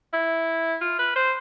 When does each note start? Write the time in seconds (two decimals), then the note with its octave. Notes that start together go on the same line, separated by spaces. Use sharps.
0.13 E4
0.81 F4
0.99 B4
1.16 C5